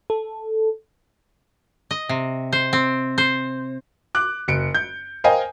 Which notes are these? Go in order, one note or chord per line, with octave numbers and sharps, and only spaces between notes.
A4
D#5
C3
C5
C4
C5
D6 F#6
F#1 C#7 D7
G6
A#4 C5 D#5 F5 G5 G#5